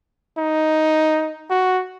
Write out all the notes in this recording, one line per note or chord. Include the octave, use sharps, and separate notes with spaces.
D#4
F#4